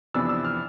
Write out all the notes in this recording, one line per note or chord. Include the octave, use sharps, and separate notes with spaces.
F2 C3 E3 B3 D4 E6
E6
F6